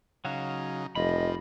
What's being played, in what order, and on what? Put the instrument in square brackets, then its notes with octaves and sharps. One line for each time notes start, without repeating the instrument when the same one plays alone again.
[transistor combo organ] C#3 D#4 [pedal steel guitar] F#3 F#4 F5
[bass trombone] F1 [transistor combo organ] F3 [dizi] D#5 [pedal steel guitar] B5